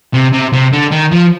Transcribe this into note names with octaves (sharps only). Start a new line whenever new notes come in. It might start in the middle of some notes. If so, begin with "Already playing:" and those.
C3
C3
C3
D3
D#3
F3